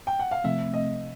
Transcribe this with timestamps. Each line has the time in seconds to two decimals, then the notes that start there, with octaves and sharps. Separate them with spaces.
0.07 G5
0.19 F#5
0.31 F5
0.44 C3 F3 A3 C4 E5
0.74 D#5